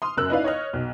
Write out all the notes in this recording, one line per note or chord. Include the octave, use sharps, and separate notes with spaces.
C6 D#6 F6
F#2 C#3 A#4 E6 F#6
D#4 E4 B4 D5 F5
C#5 D#5 F6
B1